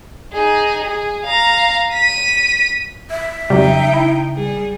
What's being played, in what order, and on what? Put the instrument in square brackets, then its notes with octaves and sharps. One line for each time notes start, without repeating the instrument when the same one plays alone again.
[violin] D#4 G#4
G#4
F5 A#5
B6 D#7
[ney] E5
[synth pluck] F2 F#3 G3 [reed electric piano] C#3 [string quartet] D#4 G5
[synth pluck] E4
[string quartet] G3 G#4